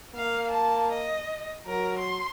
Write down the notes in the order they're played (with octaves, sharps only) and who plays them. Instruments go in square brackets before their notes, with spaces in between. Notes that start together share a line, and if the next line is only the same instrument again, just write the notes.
[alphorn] A#3 [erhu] F5
[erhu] A5
D#5
[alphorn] F#3 [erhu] A#4
[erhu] C6